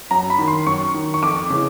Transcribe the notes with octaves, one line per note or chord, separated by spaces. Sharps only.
F#2 A#5
B5
D#3
C6
F#2 C#6
D#3
C#6
F2 D6
C#3 E3